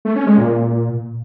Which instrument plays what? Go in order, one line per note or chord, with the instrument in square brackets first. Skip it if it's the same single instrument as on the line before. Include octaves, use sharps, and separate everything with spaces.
[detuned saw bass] A3
C#4
G#3
A#2